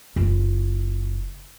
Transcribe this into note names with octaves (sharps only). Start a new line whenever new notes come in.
F#1 F4